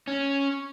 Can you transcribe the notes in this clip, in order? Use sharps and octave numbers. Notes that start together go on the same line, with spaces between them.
C#4